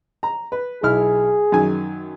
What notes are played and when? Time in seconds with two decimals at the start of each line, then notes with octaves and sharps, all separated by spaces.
0.23 A#5
0.52 B4
0.83 B1 E4 G#4 F6
1.52 F#2 D#3 G#5